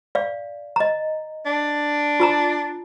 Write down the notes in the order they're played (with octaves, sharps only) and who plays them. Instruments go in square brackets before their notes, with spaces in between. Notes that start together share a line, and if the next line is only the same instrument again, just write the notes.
[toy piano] D5 F5
D#5 A#5
[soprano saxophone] D4
[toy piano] F4 A5 A#5